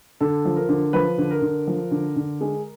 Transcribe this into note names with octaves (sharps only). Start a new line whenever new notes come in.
D3 A4
F3
A#4
D3
F3 B4
D3
A#4
D3
F3
D3
D3
G#3